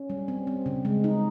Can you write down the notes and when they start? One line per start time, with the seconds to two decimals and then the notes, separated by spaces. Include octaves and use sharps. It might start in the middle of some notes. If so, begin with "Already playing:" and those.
Already playing: C#4
0.10 G3
0.28 C4
0.47 C4
0.66 C#3
0.85 G#3
1.04 D#4